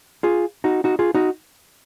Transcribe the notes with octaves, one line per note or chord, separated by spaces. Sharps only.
F4 G#4
D#4 F#4
D#4 F#4
F4 G#4
D#4 F#4